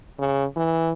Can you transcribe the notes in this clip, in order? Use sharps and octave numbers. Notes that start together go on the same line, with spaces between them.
C#3
E3